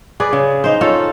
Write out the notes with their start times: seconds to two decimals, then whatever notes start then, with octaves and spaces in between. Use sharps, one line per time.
0.20 G#4 B4 D5
0.33 C#3
0.64 D#4 C5
0.81 C#4 F4 A4